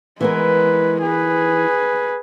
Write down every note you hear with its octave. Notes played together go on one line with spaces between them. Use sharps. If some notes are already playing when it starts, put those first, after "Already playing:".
E3 G#3 B3 A#4 B4
G#4 B4